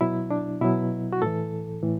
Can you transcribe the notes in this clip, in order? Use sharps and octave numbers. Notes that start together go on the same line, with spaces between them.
B2 F#3 E4
D4
B2 F#3 E4
F#4
A2 E3 A4
A2 E3